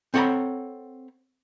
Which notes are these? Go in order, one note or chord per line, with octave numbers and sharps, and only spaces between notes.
C4 A4 C#5 F#5 A#5 B5